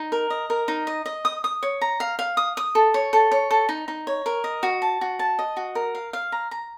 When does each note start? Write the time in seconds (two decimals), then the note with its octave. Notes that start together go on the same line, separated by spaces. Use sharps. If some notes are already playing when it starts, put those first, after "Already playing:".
Already playing: D#4
0.12 A#4
0.30 D#5
0.50 A#4
0.68 D#4
0.87 D#5
1.06 D#5
1.25 D#6
1.44 D#6
1.63 C#5
1.81 A#5
2.00 F5
2.19 F5
2.37 D#6
2.57 D#6
2.75 A4
2.94 C#5
3.13 A4
3.31 C#5
3.51 A4
3.69 D#4
3.88 D#4
4.07 C#5
4.26 A#4
4.44 D#5
4.63 F#4
4.82 A5
5.01 F#4
5.19 A5
5.39 D#5
5.57 F#4
5.75 A#4
5.95 F5
6.13 F5
6.32 A#5
6.51 A#5